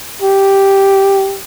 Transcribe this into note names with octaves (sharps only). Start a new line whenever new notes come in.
G4